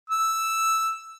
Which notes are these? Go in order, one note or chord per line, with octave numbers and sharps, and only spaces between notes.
E6